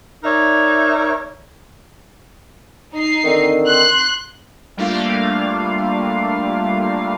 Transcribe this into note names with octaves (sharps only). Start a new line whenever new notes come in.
D#4 A#4 C#5 D5 E5
D#4 C7
D3 D#3 C4
C6 F#6
G3 A3 A#3 D4 F4 F5